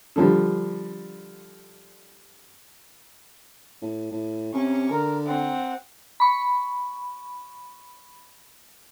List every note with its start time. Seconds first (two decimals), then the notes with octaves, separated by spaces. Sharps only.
0.16 D3 F3 G3
3.82 A2
4.12 A2
4.53 C3 C#4 C#6
4.90 D3 A#4
5.26 C4 F#5
6.20 B5 C#6